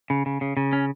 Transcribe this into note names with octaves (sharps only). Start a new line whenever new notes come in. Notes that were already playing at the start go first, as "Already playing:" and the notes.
C#3
C#3
C#3
C#3
C#4